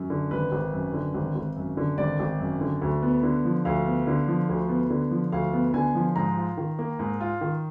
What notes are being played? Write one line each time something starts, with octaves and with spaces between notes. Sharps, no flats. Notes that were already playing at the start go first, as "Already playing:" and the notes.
Already playing: F#2
D3
G#1 B4
G#1
F#2
D3
G#1
G#1
F#2
D3
G#1 D5
G#1
F#2
D3
D2
B3
D3
F3
D2 F5
B3
D3
F3
D2
B3
D3
F3
D2 F5
B3
D3 G#5
F3
G#2 A#5
F4
D#3
A#3
G#2
F4
D#3